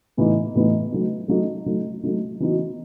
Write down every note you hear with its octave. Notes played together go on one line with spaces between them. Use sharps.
A2 E3 B3 D#4
A2 E3 B3 D#4
F#3 A3 D#4
F#3 A3 D#4
F#3 A3 D#4
F#3 A3 D#4
E3 B3 D#4 F#4